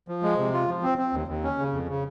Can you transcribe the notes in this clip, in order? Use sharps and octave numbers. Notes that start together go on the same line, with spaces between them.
F3
G#3
C3
F4
F3
C4
C4
D#2
D#2
C#4
C#3
F2
C#3